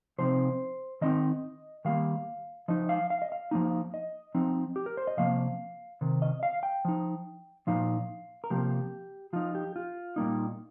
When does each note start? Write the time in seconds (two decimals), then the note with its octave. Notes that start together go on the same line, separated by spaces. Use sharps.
0.18 C3 F3 C4 D#4 C5
1.01 D#3 C4 D#4 D#5
1.85 D#3 G3 A#3 F5
2.68 F3 D#4 D#5
2.89 F5
3.10 F5
3.22 D#5
3.32 F5
3.51 F3 A#3 D#4
3.94 D#5
4.35 F3 C4 D#4
4.76 G4
4.86 A#4
4.97 C5
5.07 D#5
5.17 C3 F3 A#3 F5
6.01 C3 D#3
6.22 D#5
6.43 F5
6.63 G5
6.85 F3 D#4
7.67 A#2 F3 D#4 F5
8.44 A#4
8.50 C3 F3 A#3 G4
9.33 F3 D#4 F4
9.55 G4
9.76 F4
10.16 A#2 G3 A#3 D#4